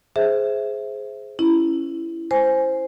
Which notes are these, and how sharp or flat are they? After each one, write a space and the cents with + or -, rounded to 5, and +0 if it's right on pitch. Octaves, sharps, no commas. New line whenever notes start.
G#4 +10 C5 +0 E5 +0
C#4 +0 E4 +10
C5 +0 G#5 +0